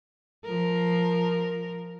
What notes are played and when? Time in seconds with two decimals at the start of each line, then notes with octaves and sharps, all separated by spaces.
0.45 F3 A#4